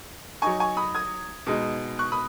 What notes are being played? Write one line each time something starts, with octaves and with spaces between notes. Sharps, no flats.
F#3 D#4 G#5 C#6
G#5 C#6
B5 D#6
D#6 G#6
B2 G#3 D#4
C#6 F#6
B5 D#6